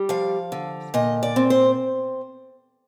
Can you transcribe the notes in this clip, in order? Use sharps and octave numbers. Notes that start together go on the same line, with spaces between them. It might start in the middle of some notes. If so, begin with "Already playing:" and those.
Already playing: G3
F3 F5
D3
A#2 D#5
D5
C4
C5